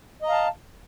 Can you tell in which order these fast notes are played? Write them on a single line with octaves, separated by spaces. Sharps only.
D#5 A#5 F5 A5